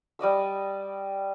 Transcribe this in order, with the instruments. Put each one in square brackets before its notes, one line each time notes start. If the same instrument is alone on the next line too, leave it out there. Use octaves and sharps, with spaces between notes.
[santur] G3 D5 D#5 E6